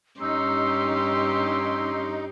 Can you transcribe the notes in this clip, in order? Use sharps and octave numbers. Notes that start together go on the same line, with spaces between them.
G2 C#4 D#4 G4 C6 E6